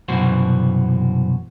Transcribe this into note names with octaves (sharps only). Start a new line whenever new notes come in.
C2 F#2 B2 E3 F#4 C5